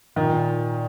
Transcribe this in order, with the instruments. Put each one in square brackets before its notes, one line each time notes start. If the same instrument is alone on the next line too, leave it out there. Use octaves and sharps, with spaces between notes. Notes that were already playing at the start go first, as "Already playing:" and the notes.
[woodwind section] A#2 [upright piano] D#3